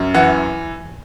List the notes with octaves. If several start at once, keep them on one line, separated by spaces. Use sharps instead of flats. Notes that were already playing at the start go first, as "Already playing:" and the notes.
Already playing: F#2
E3 F#5